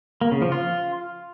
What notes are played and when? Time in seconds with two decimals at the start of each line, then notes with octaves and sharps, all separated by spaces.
0.21 A#3
0.32 C#3
0.42 F3
0.52 F4